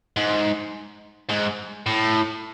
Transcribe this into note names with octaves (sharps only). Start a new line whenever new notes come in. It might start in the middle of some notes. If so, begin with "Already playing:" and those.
G#2
G#2
A2